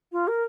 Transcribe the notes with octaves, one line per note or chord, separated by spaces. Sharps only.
F4
A#4